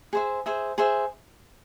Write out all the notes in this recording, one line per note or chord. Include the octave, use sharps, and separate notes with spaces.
G#4 C5 E5
G#4 C5 E5
G#4 C5 E5